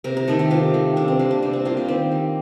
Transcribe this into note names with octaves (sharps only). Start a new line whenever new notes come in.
C3 A#4
A#4
D#3 A3 A4
G4
C3 F4
D#3 A3
C3 D4
C4
G3 A#3 D4
D4
C3 D4
C4
G3 A#3 F4
G4
D#3 C4
G3 A#3